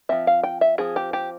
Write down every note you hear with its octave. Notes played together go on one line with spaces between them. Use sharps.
F3 C4 E5
F5
G5
E5
F3 C4 G#4
G4
G4